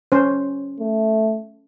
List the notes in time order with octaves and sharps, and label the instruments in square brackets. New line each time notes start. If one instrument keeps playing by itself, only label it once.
[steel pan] C#4 C5
[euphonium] A3